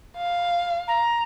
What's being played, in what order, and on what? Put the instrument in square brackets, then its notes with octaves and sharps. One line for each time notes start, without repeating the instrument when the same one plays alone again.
[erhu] F5
[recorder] A#5